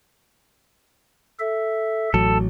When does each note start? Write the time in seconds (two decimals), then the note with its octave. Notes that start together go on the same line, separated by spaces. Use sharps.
1.39 A4 E5
2.14 A1 F#3 A4